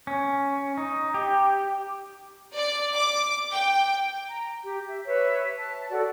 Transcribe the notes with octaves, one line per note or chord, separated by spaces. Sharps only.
C#4
D#4
G4
D5
D6
G5
A#5
G4
E5
B4 C#5 E5
A5
F#4 A4 D5